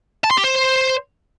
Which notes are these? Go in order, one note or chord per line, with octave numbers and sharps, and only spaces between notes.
A5
C6
G4
C5